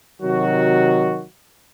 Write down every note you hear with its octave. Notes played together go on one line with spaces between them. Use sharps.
C3 D#3 F#3 F#4